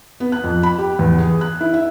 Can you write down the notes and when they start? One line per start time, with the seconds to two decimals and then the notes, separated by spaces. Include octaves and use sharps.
0.20 B3
0.32 F#6
0.44 F2
0.63 B5
0.78 G4
0.99 E2
1.18 G#4
1.41 F#6
1.61 E4
1.74 E5